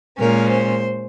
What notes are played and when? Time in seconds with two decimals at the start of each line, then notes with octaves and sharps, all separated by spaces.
0.19 A#2 G#3 C#4 A#4
0.50 C5